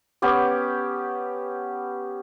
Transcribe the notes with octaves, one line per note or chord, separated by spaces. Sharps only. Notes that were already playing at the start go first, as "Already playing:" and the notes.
B3 C#4 G4 D6